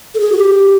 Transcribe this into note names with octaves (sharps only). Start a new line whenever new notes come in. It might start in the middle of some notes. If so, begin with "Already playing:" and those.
A4
G#4
F#4
G4